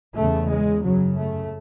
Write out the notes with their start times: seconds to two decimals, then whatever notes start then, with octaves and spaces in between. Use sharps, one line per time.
0.15 E2 C#3 A3
0.49 G#3
0.83 F#2 C#3 F#3
1.17 A3